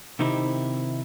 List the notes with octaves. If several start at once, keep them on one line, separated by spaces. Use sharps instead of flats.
C3 D#3 C4 D#4 E4 G4